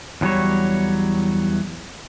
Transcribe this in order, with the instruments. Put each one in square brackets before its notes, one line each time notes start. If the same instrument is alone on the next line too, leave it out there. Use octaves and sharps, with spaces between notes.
[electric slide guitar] E2 C3 F#3 G3 C#5